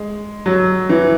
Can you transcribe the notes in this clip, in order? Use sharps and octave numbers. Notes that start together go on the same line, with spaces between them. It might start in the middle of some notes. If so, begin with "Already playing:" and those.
Already playing: G#3
F#3
E3